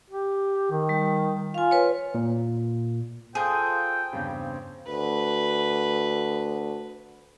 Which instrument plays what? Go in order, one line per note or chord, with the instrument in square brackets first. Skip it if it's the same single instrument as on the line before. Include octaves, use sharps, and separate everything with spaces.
[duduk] G4
D#3
[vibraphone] G3
[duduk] F4 [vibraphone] F5 G#5
[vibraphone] B4 C#5
[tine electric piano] A#2
[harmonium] F4 A4 C5 [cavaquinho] G#4 [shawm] G5 [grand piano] D#6 G6 D#7
[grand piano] E2 G2 C#3 [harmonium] C4
[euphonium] D2 [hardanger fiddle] B4